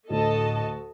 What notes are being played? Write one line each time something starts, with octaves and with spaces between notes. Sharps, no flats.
D2 A2 F#4 A4 D#5 A5